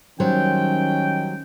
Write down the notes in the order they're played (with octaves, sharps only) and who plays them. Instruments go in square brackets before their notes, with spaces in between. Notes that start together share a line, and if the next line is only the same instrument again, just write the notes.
[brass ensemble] D#3 C#4 G5 [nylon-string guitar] F#3 G3 C5